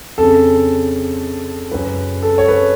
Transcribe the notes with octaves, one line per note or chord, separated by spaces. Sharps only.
F2 C#3 A4
F#2 C#3 B4
A4
C#5
B4